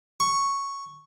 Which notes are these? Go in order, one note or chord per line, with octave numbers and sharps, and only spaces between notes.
C#6